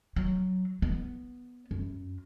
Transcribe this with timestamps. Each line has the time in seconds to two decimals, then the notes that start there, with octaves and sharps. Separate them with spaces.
0.16 F#3
0.82 B3
1.71 F#2